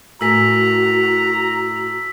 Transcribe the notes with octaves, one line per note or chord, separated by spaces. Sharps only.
A2 F#4 A#4 G#5 A#5 E6 B6